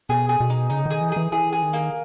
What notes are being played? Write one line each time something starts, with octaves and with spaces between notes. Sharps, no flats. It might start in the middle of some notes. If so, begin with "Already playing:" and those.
B2 G#4
G#4
B2
D#4
C#3 D#4
D#3 G#4
E3
E3 G#4
E3 G#4
G#4
D#3
A#3